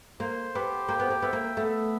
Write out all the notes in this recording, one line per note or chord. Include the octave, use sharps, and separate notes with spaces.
A#3 C5
B3 G4
A#3 G5
B3
A#3
B3 E5
A#3
A3 B3